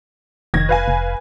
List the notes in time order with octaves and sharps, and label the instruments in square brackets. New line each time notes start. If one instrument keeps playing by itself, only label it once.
[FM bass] F1 [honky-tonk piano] D#3 G#6 A#6
[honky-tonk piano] B4 F5 G#5
[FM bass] F1